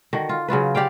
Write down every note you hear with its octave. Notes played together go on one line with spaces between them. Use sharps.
D3 D#3 F#4
F4
C#3 F#3 F4 B4
G4 D5 F5 G5